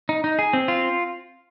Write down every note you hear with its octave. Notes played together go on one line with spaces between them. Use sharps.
D#4
D#4
G#4
C4
F4